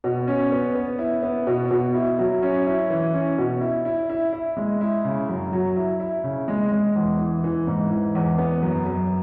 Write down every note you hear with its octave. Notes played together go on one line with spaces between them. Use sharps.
B2
C#4
B3
B3
E4
B3
B2
B2
E4
F#3
C#4
E4
E3
C#4
B2
E4
E4
E4
E4
G#3
E4
C#3
F#2
F#3
E4
E4
C#3
G#3
G#3
E2
E3
E3
G#2
E3
E2
B3
F#2
F#2